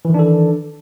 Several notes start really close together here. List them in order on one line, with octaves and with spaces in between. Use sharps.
E3 D#3 D4 A4